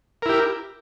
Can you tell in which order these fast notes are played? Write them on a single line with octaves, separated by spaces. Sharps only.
A#4 E4 G4